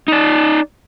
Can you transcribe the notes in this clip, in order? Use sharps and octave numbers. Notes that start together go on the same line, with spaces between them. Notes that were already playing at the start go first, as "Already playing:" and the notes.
D#4 D5